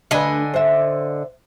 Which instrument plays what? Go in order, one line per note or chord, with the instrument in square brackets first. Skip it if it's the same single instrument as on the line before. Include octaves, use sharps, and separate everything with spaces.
[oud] D2 B4 [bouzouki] D3 D#5 G#5
[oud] C5 E5